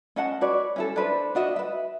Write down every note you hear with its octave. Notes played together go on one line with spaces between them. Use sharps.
C#4 D#5 F#5 A5
F#4 B4 C#5 D5
C#4 E4 A4
D4 B4 C5
D4 F#4 D#5 E5
B4 E5